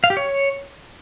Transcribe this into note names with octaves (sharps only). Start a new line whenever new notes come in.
F5
G4
C#5